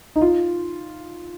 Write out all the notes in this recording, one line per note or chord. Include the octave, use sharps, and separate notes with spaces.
D#4
F4